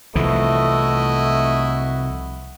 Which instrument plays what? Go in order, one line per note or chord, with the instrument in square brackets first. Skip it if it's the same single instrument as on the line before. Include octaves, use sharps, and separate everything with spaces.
[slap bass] C2 E3 F3 [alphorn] A3 [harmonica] E4 F#4 D#5